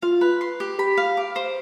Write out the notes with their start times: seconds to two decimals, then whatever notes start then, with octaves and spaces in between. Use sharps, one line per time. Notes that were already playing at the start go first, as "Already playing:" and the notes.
0.02 F4 F5
0.21 B4
0.41 C6
0.60 G4
0.79 G4 B5
0.97 F5
1.17 D6
1.36 C5